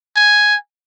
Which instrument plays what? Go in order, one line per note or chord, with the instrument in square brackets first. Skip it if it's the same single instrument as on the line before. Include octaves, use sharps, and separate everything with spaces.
[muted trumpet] G#5